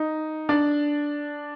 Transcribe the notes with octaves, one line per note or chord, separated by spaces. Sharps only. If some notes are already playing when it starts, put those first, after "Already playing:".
Already playing: D#4
D4 D5